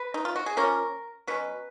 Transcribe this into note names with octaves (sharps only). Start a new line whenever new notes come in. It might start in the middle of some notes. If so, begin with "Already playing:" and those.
Already playing: B4
D#4
F4
F#4
G#4
F3 A#3 C#4 A#4
B2 F#3 C#4 B4